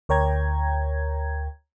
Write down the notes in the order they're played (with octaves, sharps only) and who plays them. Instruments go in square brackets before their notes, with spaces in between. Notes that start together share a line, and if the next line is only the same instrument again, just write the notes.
[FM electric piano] D2 A#4 C#5 G5 A#5 G#6